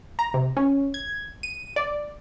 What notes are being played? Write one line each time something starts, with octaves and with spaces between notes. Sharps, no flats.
A#5
C3
C#4
G#6
D#7
D5